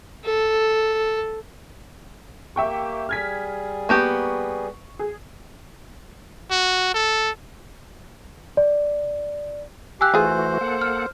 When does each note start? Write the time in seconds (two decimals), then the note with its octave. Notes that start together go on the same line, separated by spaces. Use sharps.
0.25 A4
2.56 A#3 G4 E5 G5 C#6
3.09 G3 G#4 F6 G#6 B6
3.89 A#3 B3 G4 C#6
4.99 G#4
6.51 F#4
6.94 A4
8.57 D5
10.01 G4 F5 G#5 E6 F#6
10.14 E3 A3 F4 F#4 G#4 C5
10.61 A#3 A4 F#5
10.82 F6